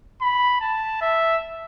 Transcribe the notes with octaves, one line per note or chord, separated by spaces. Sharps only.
B5
A5
E5